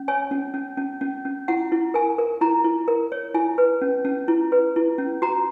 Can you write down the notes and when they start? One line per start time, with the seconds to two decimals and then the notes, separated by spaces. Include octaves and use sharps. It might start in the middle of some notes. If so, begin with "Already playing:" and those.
Already playing: C#4
0.08 C#5 G#5
0.31 C#4
0.54 C#4
0.77 C#4
1.01 C#4
1.25 C#4
1.48 E4 F#5
1.72 E4
1.94 A#4 G#5
2.18 A#4
2.41 E4 A#5
2.64 E4
2.88 A#4
3.12 C#5
3.34 E4 G#5
3.58 B4
3.81 C#4
4.05 C#4
4.28 E4
4.52 B4
4.76 E4
4.98 C#4
5.22 F#4 A#5